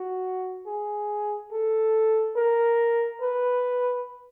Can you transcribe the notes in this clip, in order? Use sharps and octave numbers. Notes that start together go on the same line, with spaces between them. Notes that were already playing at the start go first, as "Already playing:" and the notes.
Already playing: F#4
G#4
A4
A#4
B4